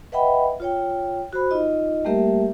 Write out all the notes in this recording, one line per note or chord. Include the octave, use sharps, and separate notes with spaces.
B4 D#5 E5 F#5 G5 B5
F4 C#5 G5
F#4 C5 B5
D#4 F4 D#5
G3 A3 A#3 G4 A#4 E5